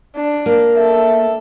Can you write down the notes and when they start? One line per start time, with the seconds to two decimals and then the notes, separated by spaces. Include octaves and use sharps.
0.16 D4
0.46 A#3
0.76 A4 E5